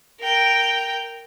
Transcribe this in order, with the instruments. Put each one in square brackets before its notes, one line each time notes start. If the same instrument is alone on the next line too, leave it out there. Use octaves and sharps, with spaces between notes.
[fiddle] A#4 G5